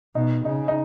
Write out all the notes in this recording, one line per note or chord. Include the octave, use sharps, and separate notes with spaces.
B2 D#4
C#3 D#4
D#4